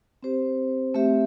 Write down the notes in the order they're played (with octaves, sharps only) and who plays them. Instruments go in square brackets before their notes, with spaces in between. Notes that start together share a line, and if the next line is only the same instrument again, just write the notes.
[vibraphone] C4 G4 C5
A3 C4 G4 E5